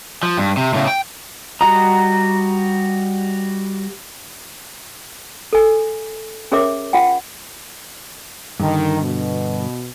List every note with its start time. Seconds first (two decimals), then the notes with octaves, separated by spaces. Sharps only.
0.23 F3
0.37 G2
0.57 C3
0.74 A2 C#3
0.88 G5
1.61 G3 F#4 D#5 A#5
5.53 A4 G#5
6.52 C#4 G#4 A#4 C#5 E5 D6
6.93 F4 F#5 G5
8.60 G2 D3 D#3
9.00 B2